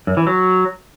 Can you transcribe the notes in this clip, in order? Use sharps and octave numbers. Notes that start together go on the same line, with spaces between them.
F#2
E3
F#3